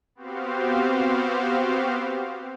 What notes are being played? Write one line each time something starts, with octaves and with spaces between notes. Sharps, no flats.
B3 C4 F#4 G4 C5 F5